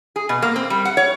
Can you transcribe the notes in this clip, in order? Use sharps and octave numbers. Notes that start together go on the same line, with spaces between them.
G#4
B2
A#3
C4
G3
F#5
C#5